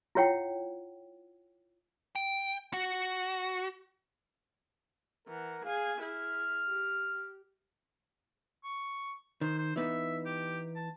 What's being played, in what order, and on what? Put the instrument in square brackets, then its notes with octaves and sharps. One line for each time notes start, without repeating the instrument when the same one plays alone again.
[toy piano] E4 F4 C#5 F#5 G5
[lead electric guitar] G5
F#4
[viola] E3 F#5 [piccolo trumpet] A#4
[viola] G#4 G#5 [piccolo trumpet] F5
[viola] E4 G#4 [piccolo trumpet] F6
[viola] G4
[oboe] C#6
[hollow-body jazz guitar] D#3 [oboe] C5
[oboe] C5
[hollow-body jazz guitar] E3 B3 D#4 [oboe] E5
[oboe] G4
A5